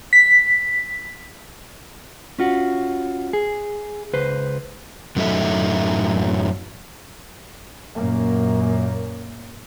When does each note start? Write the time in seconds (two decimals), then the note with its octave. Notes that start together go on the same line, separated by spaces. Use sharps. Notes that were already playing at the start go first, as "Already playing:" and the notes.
0.13 B6
2.39 C#4 F4 F#4
3.33 G#4
4.13 C#2 B4 C5
5.16 F#2 A2 F#3 D#4 A4 E5
7.95 F#2 A#2 A#3